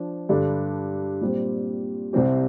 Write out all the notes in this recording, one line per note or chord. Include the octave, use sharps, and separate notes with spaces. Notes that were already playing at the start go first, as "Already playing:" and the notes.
Already playing: F3 D4
G2 D3 G3 D4
A#2 G3 C4
C2 C3 G3 C4 G4